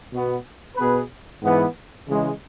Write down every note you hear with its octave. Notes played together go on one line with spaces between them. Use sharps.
B2 B3 F#4
B2 B3 G#4 B4
G#2 E3 B3
C#3 E3 G#3